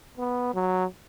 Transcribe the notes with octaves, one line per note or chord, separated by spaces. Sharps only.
B3
F#3